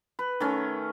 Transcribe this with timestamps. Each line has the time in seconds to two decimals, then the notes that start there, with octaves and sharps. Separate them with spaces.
0.19 B4
0.40 D#3 A3 C#4